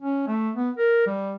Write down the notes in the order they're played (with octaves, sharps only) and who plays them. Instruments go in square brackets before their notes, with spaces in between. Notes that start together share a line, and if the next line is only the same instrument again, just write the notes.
[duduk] C#4
A3
B3
A#4
G3